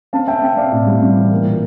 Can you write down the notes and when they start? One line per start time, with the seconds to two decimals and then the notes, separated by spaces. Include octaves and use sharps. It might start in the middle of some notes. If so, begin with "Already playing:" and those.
0.13 C4 F5 A5
0.27 C4 E5 G5
0.42 C4
0.57 C4 D5 F5
0.72 A2
0.86 G3
1.02 C4
1.16 E3
1.31 A#3
1.46 A#2